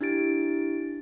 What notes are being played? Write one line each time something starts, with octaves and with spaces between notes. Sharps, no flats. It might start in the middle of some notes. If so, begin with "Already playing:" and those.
D4 E4 G4 A6 D7